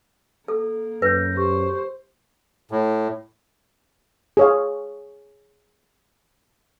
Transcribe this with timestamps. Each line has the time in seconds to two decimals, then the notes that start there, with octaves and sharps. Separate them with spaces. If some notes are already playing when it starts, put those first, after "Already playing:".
0.48 A#3 A4
1.02 F#2 B4 G6 A#6
1.36 G4 C5 C#6
2.71 A2
4.37 G#4 C#5 F5